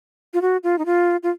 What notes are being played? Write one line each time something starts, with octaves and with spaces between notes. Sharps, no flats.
F4
F#4
F4
D#4
F4
F4